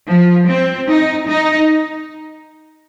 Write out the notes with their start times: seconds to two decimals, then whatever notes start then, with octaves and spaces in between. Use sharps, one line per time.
0.08 F3
0.48 C4
0.89 D#4
1.28 D#4